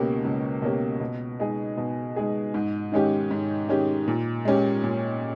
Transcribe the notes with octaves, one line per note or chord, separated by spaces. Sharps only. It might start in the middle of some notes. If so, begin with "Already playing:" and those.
Already playing: C#2 B2 A#3 C#4 G4
C#2
B2 A#3 C#4 G4
B2
G#3 D#4 G#4
B2
G#3 D#4 G#4
G#2
D#3 G#3 C#4 G4
G#2
D#3 G#3 C#4 G4
A#2
G#3 C#4 G4
A#2